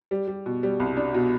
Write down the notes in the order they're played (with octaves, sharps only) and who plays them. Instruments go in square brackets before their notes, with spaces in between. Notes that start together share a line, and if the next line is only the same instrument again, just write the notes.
[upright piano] G3
G3
B2
G3
C2
D4
B2